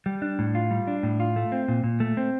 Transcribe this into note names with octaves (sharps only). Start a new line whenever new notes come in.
G3
D4
A2
F4
G3
D4
A2
F4
A3
C4
A#2
A#2
A3
C4